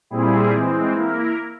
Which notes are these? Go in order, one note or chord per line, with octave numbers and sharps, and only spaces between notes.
A#2 G3 C4 E4 G#4
E3 G#3 C4
A#3 E4 A#4